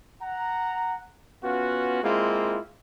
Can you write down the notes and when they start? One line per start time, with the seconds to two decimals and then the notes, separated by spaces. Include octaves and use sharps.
0.22 F#5 A#5
1.43 B3 C#4 F4 F#4
2.03 G#3 A#3 C4 E4 F4